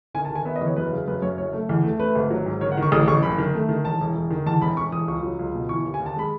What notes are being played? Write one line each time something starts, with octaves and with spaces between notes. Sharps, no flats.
D#3 G#5
A5
D#3 G#5
B3 E5
D#5
E2
C#5
F#2 B4
C#3
F#2 B4
F#2 C#5
F#1 C#5
A3
E2
A3
A3 B4
G#1
F#3
G#2
D#3 C#5
F#5
D#3
C#6
A1 D#6
A1 C#6
F#1 B5
D#3
A3
D#3
E1 A5
E1
E1
D#3
E2 A5
E1 B5
E1 C#6
E1 D#6
C#2 C#6
F#3
C#2
B2
E3 C#6
D#2
G#5
D#2
A5
G#3 B5